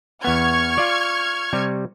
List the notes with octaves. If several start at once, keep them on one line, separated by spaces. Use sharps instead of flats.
E2 B3 C#6 F6 G#6
F4 D5
C3 G3